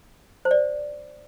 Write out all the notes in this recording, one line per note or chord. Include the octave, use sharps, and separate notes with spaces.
C5
D5